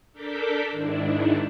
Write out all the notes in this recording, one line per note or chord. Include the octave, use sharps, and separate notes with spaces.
D4 A4 A#4 D6 G6 B6
G#2 D#3 D4 E4